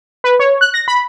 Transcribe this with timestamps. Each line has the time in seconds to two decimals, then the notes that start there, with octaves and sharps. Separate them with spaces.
0.24 B4
0.40 C#5
0.61 F#6
0.74 A#6
0.88 B5